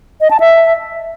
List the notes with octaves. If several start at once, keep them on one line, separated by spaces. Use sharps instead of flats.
D#5
A5
E5